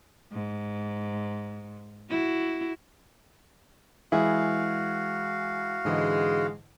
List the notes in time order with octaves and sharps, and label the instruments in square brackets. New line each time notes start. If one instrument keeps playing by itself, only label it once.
[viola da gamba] G#2
E4 F#4
[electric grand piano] E3 G#3 [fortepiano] E4 G#4 [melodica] F#4 F5
[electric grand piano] G#2 D3 E3 [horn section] G#3